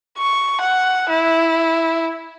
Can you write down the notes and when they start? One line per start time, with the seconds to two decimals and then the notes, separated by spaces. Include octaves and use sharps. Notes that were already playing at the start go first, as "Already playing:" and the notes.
0.18 C#6
0.61 F#5
1.09 E4